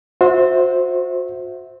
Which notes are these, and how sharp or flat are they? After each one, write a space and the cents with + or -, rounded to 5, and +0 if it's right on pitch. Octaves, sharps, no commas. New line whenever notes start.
F#4 -35 C5 +0 E5 -20